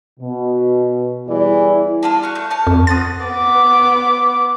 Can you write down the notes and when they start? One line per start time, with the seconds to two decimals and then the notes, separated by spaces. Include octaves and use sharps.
0.20 B2
1.28 E2 E3 G3 E4 G#4 D5
2.03 D4 F4 A4
2.22 F#4 C#6 F6
2.35 A3
2.50 C#5 A5 F6
2.67 F2
2.87 C5 F#5 D#6 A6
3.25 B3 D6